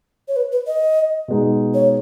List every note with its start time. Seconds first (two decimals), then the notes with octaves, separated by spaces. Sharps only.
0.28 C#5
0.36 B4
0.52 B4
0.67 D#5
1.28 B2 G#3 D#4
1.74 C#5